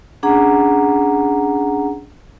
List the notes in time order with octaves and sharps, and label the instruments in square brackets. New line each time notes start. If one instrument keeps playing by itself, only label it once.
[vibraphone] C#4 D4 G#4 F#5 A#5